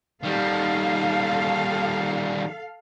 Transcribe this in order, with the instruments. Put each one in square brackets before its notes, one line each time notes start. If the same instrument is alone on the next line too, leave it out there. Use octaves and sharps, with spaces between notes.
[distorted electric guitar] D#3 G3 [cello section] A4 F5